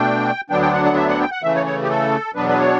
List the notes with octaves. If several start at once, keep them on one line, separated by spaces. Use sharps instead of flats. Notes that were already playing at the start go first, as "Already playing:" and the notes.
Already playing: B2 A3 D4 G5
D2 D3 F#3 B3 D4 G5
G5
F#5
F#5
E5
F#5
G5
F#5
C#3 E3 A3 E5
C#5
C#5
G4
A4
E2 B2 F#3 B3 D4 B4
B4
C#5